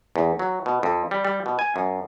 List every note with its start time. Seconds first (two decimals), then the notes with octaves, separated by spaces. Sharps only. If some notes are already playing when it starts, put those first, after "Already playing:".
0.16 E2
0.39 F#3
0.66 B2
0.83 F2
1.11 G3
1.25 G3
1.46 B2
1.59 G#5
1.76 F#2